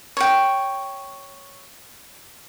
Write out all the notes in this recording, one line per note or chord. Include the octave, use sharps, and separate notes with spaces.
C#5 G5